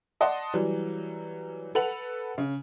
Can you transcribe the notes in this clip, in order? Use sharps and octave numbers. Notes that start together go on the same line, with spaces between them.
D5 D#5 F#5 A5 C6
E3 F#3 G3
A4 B4 F#5 F7 F#7
C#3